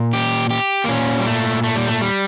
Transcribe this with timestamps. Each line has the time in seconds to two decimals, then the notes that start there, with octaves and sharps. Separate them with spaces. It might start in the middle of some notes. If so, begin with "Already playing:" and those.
Already playing: A#2
0.13 G4
0.50 G4
0.84 A#3
0.88 A#2 C#4
1.19 G3
1.26 A3
1.64 A3
1.76 G3
1.87 A3
2.01 G3